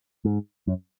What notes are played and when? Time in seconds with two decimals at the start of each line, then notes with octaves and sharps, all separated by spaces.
0.25 G#2
0.67 F#2